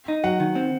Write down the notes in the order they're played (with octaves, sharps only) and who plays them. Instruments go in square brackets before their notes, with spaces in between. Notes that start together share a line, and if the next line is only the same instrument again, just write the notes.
[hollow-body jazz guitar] D#4
[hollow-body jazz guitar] F#3 [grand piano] F#5
[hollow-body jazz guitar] D#3
C4